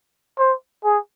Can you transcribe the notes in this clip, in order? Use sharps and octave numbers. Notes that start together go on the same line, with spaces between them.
C5
G#4